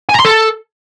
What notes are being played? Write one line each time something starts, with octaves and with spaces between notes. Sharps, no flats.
G#5
A#5
C6
A4